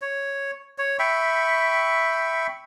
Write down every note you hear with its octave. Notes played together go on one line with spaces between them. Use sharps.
C#5
C#5
E5 G5 B5 C#6